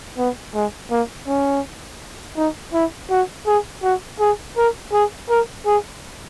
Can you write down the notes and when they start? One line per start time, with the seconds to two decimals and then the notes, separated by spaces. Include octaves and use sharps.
0.18 B3
0.54 G#3
0.91 A#3
1.27 C#4
2.37 D#4
2.73 E4
3.11 F#4
3.47 G#4
3.83 F#4
4.20 G#4
4.57 A#4
4.93 G#4
5.30 A#4
5.66 G#4